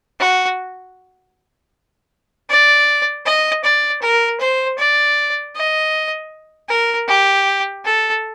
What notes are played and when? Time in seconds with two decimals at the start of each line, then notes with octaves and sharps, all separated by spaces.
0.20 F#4
2.50 D5
3.25 D#5
3.64 D5
4.02 A#4
4.40 C5
4.78 D5
5.55 D#5
6.69 A#4
7.08 G4
7.84 A4